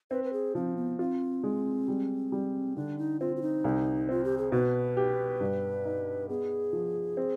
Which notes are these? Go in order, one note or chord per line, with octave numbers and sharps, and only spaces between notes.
C4 B4
B4
G#4
F3 C4
B3
C4 F4
G#3
G3
G3
D3 D4
D#4
C4 F4
F4
D#4
C2
C4 F4
G4
G#4
B2 B4
G4
G2
D#4
B3 G#4
F3
C4